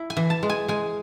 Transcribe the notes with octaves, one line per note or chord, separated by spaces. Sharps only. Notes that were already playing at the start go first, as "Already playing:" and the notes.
Already playing: E4
G#5
E3
A5
G#3
G#5
G#3 G#5